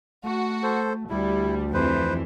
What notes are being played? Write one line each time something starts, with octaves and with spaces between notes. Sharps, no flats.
A3 F#4
A4 C5
D2 G3 E4
F2 E3 B4 C5